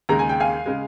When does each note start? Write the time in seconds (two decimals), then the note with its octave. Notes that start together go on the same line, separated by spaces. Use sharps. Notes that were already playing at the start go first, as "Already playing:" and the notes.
0.09 D#2 C#3 G#3 A#5
0.19 G#5
0.29 G5
0.40 F5 G#5
0.66 C#3 G#3